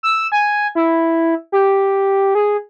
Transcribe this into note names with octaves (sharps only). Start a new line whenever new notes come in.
E6
G#5
E4
G4
G#4